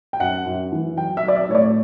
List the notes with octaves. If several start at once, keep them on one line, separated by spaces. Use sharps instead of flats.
G5
F#2 F#5
F#2
E3
F#3 G5
E5
F#3 D5
E5
A2 C#5
D5